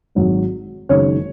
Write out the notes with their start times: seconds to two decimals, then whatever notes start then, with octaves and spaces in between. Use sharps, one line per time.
0.15 G#1 G#2 F#3
0.89 F#1 F#2 D#3 G#3 C#5